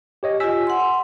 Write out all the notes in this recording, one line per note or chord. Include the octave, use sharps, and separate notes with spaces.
G4 C#5 D#5
F4 G4 G#5 E6 B6
F#5 C6